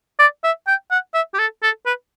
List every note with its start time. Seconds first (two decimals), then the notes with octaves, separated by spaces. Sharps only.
0.19 D5
0.44 E5
0.67 G5
0.91 F#5
1.14 E5
1.34 G4
1.39 A4
1.63 A4
1.86 B4